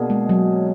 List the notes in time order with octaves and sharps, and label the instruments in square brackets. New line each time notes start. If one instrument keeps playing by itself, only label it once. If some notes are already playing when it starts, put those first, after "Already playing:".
Already playing: [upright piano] B2 A#3 D4 G#4
[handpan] G#3
F#3